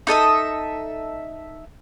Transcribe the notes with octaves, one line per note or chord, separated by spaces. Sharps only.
D#4 A4 D#5 E5